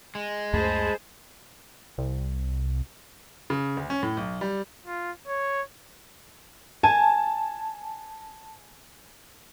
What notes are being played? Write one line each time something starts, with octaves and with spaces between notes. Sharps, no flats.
G#3
C#2 F#2 A3 G#4 C5 A5 B5
C2
C#3
D2
C#4
A2
B1
G3
F4
C#5
G#5 A5